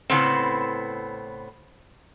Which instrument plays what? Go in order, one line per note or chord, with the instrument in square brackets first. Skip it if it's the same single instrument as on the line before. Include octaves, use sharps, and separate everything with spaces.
[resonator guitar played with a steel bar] A2 C#3 B3 C4